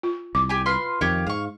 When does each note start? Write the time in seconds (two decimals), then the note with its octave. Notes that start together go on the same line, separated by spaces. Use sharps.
0.03 F4
0.35 C2 D6
0.49 G4 G#5
0.66 F4 B4 C6
1.01 F2 D#3 G4 C#5 F5
1.27 G#2 F5 C#6